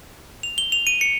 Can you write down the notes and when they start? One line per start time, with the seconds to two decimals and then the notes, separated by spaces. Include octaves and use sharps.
0.43 F7
0.58 G7
0.72 F7
0.87 D#7
1.01 C#7